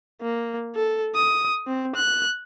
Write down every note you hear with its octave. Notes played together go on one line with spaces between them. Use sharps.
A#3
A4
D#6
C4
F#6